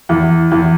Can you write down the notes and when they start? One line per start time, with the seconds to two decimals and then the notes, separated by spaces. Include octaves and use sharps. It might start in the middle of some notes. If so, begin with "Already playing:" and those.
0.09 E2
0.52 E2